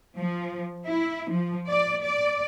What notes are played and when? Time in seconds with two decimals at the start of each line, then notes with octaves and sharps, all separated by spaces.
0.18 F3
0.87 E4
1.31 F3
1.69 D5
2.04 D5